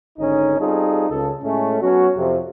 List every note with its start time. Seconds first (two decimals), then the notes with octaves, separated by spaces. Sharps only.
0.19 G#1 D3 C#4 D#4
0.60 G3 C4 D#4 F4 G#4 A4
1.10 C#2 A4
1.42 A2 G#3 A3 C#4
1.82 F#3 B3 C#4 F#4
2.17 F2 C3